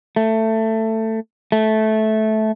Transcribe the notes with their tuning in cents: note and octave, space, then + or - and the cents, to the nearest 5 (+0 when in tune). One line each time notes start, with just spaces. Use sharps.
A3 +15
A3 -15